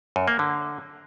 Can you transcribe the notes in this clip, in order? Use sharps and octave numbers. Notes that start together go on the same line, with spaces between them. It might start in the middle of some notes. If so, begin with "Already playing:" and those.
F#2
A#3
D3